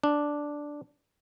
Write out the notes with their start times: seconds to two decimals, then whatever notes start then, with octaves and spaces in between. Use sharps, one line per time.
0.04 D4